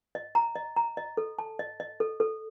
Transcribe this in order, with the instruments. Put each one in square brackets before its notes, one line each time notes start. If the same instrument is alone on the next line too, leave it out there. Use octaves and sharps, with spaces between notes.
[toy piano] D#5
A#5
D#5
A#5
D#5
A4
A5
D#5
D#5
A4
A4